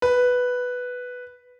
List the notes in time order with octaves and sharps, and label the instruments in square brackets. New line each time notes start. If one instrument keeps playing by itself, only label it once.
[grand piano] B4